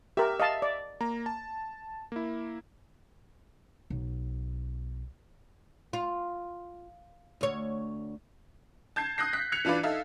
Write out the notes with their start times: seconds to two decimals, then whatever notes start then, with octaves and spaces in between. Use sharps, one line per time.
0.17 G4 A#4 E5
0.40 D#5 F5 A5
0.62 D5
1.01 A#3 A#5
1.26 A5
2.12 A#3 E4
3.90 B1
5.93 F4
7.41 D2 C#5
8.96 A5 G6 G#6 C7
9.18 D#6 F#6 G6 A#6 C7
9.33 F#6 B6
9.52 F#6 G#6 B6 C#7 F7
9.65 E3 D4 F4 B4 D5
9.83 D#4 A4 E5 F5